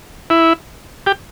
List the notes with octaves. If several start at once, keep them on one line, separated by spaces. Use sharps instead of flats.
E4
G4